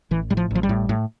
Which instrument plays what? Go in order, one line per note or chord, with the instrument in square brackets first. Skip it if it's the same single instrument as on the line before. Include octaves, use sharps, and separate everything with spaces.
[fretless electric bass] A1 E3
A2 G3
F3
A1 F3
G3
A2
A2